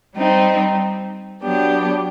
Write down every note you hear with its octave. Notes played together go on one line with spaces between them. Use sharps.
G3 C4 D#4
F#3 B3 D4 G4